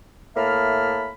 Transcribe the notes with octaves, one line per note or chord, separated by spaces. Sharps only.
A2 A#3 E5 A5 B5 F6